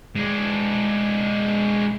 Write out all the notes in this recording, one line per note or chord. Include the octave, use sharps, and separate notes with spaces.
G#3 D4